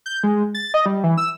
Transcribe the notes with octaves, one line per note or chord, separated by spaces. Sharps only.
G6
G#3
A6
D#5
G3
E3
E6